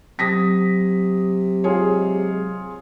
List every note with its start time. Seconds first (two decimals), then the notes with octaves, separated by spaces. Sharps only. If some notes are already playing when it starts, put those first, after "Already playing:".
0.19 C3 F#3 D#6 A#6 B6
1.64 G#3 F4 G#4 C#5